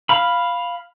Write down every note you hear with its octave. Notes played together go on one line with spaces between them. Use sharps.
F5 B5